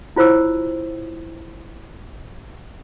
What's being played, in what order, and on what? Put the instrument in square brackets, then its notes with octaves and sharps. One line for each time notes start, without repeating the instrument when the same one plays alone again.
[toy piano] E4 F4 C5 C#5 E6